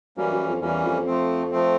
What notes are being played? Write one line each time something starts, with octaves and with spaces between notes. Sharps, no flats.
F#2 E3 G3 A#3 C#4
F#2
F2
E2 E3 G3 A#3 C#4
F2
F3 A3 C4
F3 A3 C4